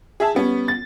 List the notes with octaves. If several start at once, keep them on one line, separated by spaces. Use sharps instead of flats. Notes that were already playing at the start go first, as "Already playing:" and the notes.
G#4 E5 A5
G3 B3 C#4
A6